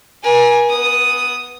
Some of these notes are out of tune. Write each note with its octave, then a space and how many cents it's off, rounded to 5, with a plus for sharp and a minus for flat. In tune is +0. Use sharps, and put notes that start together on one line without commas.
A#4 +45 G#5 +0
B3 -5 D#6 +0